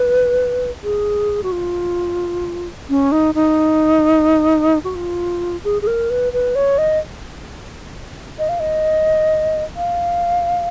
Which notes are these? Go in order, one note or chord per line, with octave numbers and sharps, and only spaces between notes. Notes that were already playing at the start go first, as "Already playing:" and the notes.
Already playing: B4
G#4
F#4
F4
C#4
D#4
D#4
F#4
F4
G#4
G#4
A#4
B4
B4
C#5
D#5
D#5
F5
D#5
F5